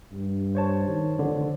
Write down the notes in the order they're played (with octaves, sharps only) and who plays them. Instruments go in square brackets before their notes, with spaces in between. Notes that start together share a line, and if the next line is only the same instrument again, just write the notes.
[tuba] G2
[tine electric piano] C5 C#5 A5
[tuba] D#3
[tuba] F1 [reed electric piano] D3